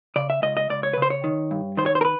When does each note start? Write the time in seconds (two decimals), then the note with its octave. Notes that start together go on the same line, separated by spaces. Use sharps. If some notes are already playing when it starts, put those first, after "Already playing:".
0.16 C#3 D5
0.30 E5
0.42 C#2 D#5
0.57 D#5
0.70 C#2 D5
0.83 C#5
0.93 B4
0.97 C#3 C5
1.10 C#5
1.24 D#3
1.51 G2
1.77 D#3 C5
1.86 C#5
1.95 C5
2.01 A#4
2.05 B4